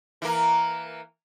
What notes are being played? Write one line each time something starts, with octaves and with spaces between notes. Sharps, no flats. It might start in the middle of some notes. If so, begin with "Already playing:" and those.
E3 A#3